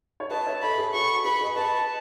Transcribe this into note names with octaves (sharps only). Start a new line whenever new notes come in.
C#5
B4 D#5 A5
C#5 E5
A4 C#5 B5
G#4 B4
F#4 A4 C#6
G#4 B4 B5
B4 D#5
B4 D#5 A5